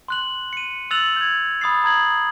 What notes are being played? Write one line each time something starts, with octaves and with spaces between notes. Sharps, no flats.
C6 F#6 F#7
C#7 D#7
E6 F#6 A6 F7 F#7
G6 G#6
B5 D#6 A6 C7
A#5 D#6 G#6 F#7